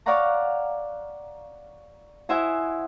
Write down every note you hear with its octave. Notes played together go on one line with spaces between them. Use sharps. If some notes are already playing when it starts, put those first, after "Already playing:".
C#5 D5 F5 F#5 A#5 C#6
E4 C5 D#5 E5 F#5 G#5